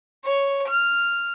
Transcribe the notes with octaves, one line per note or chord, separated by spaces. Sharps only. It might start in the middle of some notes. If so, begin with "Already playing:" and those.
C#5
F6